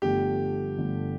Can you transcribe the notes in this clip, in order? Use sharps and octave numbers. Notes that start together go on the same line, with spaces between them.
G1 G2 D3 F3 A3 G4
G1 G2 D3 F3 A3